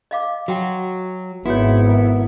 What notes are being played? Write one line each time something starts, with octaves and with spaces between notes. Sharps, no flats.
D#5 F5 D6
F#3 F#4 F#5 G5
G#1 B3 E4 F#4 C#5